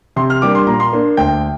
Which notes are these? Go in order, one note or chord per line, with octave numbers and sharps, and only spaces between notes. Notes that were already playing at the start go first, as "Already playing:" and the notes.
C3 C6
F6
G3 A#3 D4 D6
C6
A#2 A#5
C6
A#3 D4
D2 G5